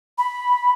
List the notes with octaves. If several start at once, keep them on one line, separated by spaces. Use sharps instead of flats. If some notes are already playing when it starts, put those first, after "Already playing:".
B5